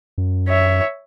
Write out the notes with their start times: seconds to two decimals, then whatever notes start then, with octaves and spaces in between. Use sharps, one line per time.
0.18 F#2
0.48 C#5 E5